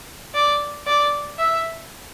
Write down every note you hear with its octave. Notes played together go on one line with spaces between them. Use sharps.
D5
D5
E5